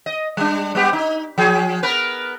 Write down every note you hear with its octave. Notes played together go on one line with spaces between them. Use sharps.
D#5
G3 D4
G3 B3 G4
D#4
F3 G#4
B3 A#4 B4